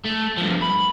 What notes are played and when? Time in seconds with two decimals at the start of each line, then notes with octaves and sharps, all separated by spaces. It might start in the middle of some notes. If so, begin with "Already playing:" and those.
0.05 A3
0.38 G2 F3
0.62 B5